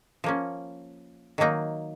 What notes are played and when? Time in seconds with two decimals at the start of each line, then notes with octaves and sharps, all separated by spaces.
0.24 F3 A#3 C#4
1.38 D#3 F#3 A#3 D#4